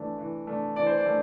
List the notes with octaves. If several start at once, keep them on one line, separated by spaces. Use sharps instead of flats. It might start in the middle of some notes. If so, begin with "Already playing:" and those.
Already playing: E3 A3 D4
E3
A3 D4
E3 D5
C5
D5
A3 D4